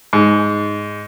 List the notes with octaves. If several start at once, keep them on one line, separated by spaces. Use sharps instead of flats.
G#2